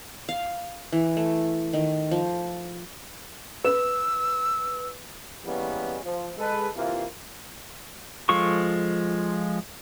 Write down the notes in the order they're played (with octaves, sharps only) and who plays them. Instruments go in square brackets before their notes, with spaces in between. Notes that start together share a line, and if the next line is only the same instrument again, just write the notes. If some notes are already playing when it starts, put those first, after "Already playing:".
[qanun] F5
E3
A3
D#3
F3
[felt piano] B4 E7 [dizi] E6
[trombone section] E3 G3 G#3 A#3 B3 C#4
F3
G#3 A4 B4
C3 E3 A#3 F4
[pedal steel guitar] F3 G#3 F4 A4 C#6